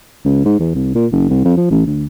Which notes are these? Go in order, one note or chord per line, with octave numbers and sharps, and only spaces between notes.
C#2
G#2
E2
C2
A#2
F#1
C2
F2
F3
A1
D2